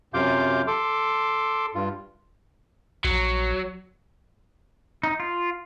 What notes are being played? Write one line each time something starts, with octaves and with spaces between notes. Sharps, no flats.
F#2 C3 F4 F5 D6 G6
A4 C6 D6
G2 F4
A#1 F#3
D#4
F4